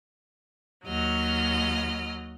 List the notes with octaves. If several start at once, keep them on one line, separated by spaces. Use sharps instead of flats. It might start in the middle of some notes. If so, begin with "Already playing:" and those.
D#2 F#3 D#5 F6